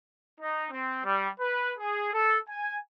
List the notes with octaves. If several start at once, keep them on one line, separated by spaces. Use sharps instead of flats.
D#4
C4
G3
B4
G#4
A4
G#5